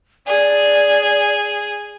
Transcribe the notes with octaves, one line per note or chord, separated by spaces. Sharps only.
G#4 D5